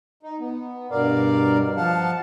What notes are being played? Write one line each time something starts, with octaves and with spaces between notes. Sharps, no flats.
D#4
B3
G2 B2 A#4 D5 F5
F3 F5 F#5 A5